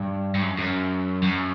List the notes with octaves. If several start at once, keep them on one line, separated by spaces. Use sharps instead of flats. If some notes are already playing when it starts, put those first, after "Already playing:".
Already playing: G2
G2
F#2
F#2
F#2